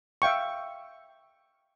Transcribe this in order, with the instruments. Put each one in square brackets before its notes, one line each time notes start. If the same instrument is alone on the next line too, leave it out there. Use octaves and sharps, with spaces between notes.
[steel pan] E5 F5 G5 C#6